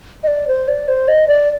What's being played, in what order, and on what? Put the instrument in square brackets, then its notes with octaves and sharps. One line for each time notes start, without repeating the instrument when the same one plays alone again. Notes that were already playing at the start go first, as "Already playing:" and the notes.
[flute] D#5
D5
C5
D5
C5
D#5
D5